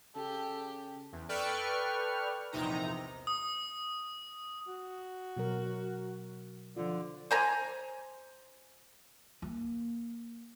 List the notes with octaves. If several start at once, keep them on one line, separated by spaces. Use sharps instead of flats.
C#3 G4 A4
E2
A4 B4 D5 G5 C#6 F6
A#1 E2 C3 D#4 A#5
D#6
F#4
B2 F#3 A#4
D3 F3 F4
C5 G#5 A#5
A#3